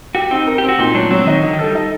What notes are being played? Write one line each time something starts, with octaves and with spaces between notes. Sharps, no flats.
F#4 G4
C4 D#4
A#4
G4
C4
F#4
A#2 D#4
F#3 D4
F#3 C4
D#3 D#4
D3 D#4
D#3
G3 A4
D#4